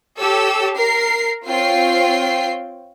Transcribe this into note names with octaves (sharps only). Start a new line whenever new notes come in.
G4 A4 C#5 E6
A#4 C7
C4 F4 C#5 G5 C7